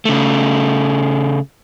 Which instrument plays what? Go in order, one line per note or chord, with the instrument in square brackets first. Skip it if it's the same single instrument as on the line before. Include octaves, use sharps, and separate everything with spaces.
[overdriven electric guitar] C#3 A3